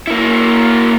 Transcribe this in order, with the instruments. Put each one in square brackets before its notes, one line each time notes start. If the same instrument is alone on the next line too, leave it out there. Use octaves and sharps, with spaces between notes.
[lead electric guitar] A#3 E4